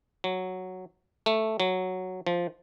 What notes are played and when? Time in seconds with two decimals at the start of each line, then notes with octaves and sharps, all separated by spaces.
0.24 F#3
1.26 A3
1.60 F#3
2.27 F3